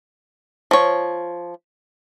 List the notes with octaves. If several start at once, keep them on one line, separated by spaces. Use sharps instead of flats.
F3 C#5